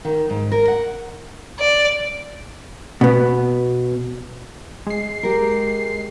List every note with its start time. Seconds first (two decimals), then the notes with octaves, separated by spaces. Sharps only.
0.05 D#3
0.30 G#2
0.52 A#4
0.68 F#5
1.60 D5
3.01 B2 B3
4.87 G#3 C7
5.23 G4 A#4